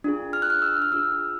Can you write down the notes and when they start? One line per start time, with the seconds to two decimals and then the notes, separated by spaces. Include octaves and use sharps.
0.04 D4 F4 G#4
0.33 F6
0.42 F#6
0.50 F6
0.62 E6
0.82 F6
0.92 D4 F4 G#4 E6